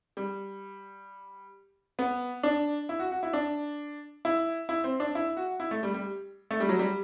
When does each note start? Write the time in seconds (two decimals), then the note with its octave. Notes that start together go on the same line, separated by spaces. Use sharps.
0.17 G3
1.99 B3
2.43 D4
2.89 E4
2.99 F#4
3.12 F#4
3.23 E4
3.33 D4
4.25 E4
4.69 E4
4.84 C4
5.00 D4
5.15 E4
5.37 F#4
5.60 E4
5.71 A3
5.83 G3
5.94 G3
6.51 A3
6.60 G3
6.69 F#3
6.79 G3